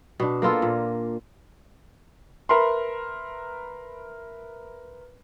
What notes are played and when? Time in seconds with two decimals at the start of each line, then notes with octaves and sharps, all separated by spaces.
0.20 B2 D4
0.42 A#3 B3 F4 A4
0.62 A#2
2.49 A#4 B4 E5 B5 C6